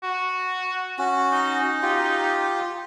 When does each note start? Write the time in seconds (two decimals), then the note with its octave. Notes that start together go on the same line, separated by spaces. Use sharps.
0.03 F#4
0.99 C#4 F#4
1.32 D#4
1.82 F4 G4